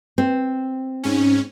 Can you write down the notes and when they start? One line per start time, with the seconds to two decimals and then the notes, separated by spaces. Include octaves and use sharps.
0.18 C4
1.04 G#2 C#4